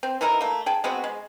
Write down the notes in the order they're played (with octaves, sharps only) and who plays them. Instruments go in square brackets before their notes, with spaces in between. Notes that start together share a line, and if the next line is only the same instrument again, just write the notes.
[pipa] C4
E3 D#4 E4 A#4
A3 A#3
G#4 G5 A5
G#3 B3 C4 F#4
G#3